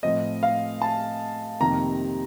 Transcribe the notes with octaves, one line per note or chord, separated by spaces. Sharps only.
A2 F3 C4 D#5
F5
A5
F2 C3 D#3 A#3 A#5